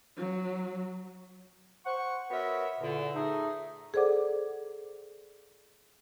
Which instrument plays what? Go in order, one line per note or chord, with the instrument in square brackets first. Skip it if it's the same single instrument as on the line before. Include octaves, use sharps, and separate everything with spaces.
[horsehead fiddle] F#3
[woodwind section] C5 F#5 C#6
B3 F#4 A#4 B4 C#5 E5
E2 A#2 D3
A3 D#4 G#4
[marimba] G#4 A4 C5 D5 F#5 D6